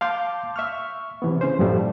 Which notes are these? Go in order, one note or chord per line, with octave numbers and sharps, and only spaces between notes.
F5 A5 C6 D6 G6
E5 C#6 F6
C3 E3 B3
C#3 C#4 C5
F#2 A2 F3 G3 A3